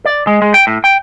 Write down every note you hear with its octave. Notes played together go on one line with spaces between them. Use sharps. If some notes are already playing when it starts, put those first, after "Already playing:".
D5
G#3
G#3
G5
A2
G5